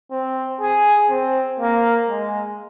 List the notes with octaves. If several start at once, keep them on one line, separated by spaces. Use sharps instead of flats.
C4
G#4
C4
A#3
G#3